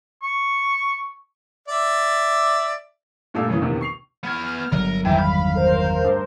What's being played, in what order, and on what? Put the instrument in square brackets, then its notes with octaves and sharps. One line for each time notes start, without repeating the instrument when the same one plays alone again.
[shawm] C#6
[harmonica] D5 E5
[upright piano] G2 A#2 A3 F5 E6
F#2 C#3 E3
A#1 E2 C3 D#3
C#6 C7 F7
[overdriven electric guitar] B3 G#5 [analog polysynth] F6
[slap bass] G1 F#3 [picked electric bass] D3 [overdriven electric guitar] A#4
[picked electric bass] E2 D#3 G3 [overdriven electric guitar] E3 [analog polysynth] E5 G5 A#5
[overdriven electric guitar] F5 [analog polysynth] B5
[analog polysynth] A#4 C5
[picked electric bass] D2 G2